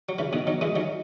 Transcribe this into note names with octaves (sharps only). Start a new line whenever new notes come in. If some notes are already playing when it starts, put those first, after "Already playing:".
F#3
C#3 E3
B2 D#3
D#3 F#3
E3 G#3
D#3 F#3